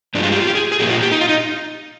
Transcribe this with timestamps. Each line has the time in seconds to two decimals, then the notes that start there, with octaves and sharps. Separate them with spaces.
0.15 G2 F3 G#3 D4
0.23 F4
0.32 G4
0.40 F4
0.47 G4
0.55 G#4
0.72 G#4
0.80 A#2 F3 A#3 G4
0.90 F4
1.02 G4
1.12 D#4
1.21 F4
1.29 D#4